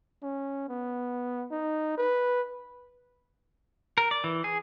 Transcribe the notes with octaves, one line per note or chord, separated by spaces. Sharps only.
C#4
B3
D#4
B4
A#4
D5
E3
G#4